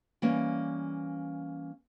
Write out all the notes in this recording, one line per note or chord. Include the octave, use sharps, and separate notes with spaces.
E3 G3 A#3 C#4